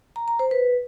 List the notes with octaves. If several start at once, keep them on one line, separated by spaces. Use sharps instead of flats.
A#5
A#5
C5
B4